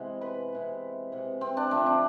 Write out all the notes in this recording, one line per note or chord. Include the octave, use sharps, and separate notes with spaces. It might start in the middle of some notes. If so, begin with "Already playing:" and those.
Already playing: C3 E3 G#3 B3
B4
C3 E3 B3
C3 E3 B3
C4
D4
D3 F3 A3 C4
D4